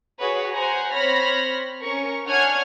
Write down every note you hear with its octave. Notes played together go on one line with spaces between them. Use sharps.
F#4 G#4 B4 C#5
C5 F#5 G#5 A#5
C4 C5 C#5 B5 F6 A#6
C#4 A#4 C#6
D4 C#5 F#5 G#5 F6 G#6